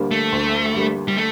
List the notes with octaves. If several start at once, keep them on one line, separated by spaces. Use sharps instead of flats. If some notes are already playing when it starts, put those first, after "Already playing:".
Already playing: D2 D3 G3 A#3
A3
D2
D3 G3 A#3
G3
A3